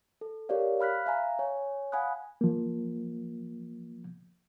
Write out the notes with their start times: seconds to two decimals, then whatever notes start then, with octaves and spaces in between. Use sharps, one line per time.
0.21 A4
0.49 G4 A#4 C#5 D5 F5
0.80 F5 B5 F6 F#6 B6
1.06 E5 F5 G#5 A#5
1.39 C#5 G#5
1.92 F5 F#5 G#5 B5 D#6 F#6
2.41 F3 A#3